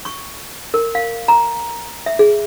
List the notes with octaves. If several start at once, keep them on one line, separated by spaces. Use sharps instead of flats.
C#6
A#4
F5
A#5
E5
G#4